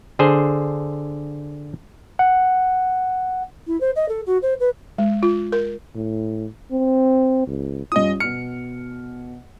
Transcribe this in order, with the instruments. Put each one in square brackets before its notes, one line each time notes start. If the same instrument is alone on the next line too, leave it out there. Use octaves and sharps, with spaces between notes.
[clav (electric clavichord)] D3 G#4 C5
[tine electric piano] F#5
[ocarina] E4
C5
D#5
A4
F#4
C5
B4
[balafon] G#3
F4
A#4
[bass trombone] A2
C4
C#2
[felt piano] G2 C#4 F4 [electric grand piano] D#5 D#6
[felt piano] B2 F6 [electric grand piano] C#7